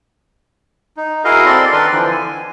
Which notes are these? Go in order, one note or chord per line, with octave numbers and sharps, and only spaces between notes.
D#4
E4 F#4 G#4 A#4 D#5 F5
C4 A4 D5 C6
D#3 D4 A#4 B4 D5 C6
D3 E3 F3
G#5